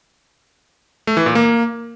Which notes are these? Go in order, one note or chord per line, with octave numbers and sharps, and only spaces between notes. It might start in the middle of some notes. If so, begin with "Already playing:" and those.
A3
E3
A#2
A#3